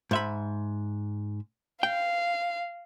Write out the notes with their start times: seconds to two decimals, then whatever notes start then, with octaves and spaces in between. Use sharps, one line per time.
0.11 G#2 E5 B5
1.83 F5 G5